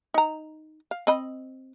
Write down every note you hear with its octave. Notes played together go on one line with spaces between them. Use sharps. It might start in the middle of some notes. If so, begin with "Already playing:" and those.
D#4 A#5
F5
C4 D#5 B5